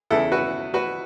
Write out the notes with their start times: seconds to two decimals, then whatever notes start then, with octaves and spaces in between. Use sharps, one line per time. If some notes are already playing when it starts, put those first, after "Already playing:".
0.11 E2 C#3 E3 E4 A4
0.32 F#4 B4
0.74 F#4 B4